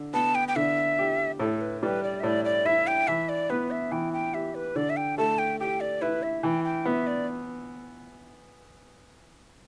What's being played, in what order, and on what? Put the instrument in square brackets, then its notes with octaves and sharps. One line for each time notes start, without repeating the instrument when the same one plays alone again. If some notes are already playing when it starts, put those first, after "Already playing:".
Already playing: [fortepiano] D3
[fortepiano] B3 [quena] A5
[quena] G5
G5
[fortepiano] D3 [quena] E5
[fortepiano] G4
[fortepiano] A2 [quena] A4
[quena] B4
[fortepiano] G3 [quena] B4
[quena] D5
E5
[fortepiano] A2 [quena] D5
[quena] D5
[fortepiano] E4 [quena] E5
[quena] G5
[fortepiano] E3 [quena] E5
[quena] D5
[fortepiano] B3 [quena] B4
[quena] E5
[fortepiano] E3 [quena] G5
[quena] G5
[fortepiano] G4 [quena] E5
[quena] B4
[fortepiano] D3 [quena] D5
[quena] E5
G5
[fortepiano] A3 [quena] A5
[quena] G5
[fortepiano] G4 [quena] G5
[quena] D5
[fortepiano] E4 [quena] B4
[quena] E5
[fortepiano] E3 [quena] G5
[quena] G5
[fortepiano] B3 [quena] E5
[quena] D5